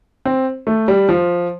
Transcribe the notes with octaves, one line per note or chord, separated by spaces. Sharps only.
C4
A3
G3
F3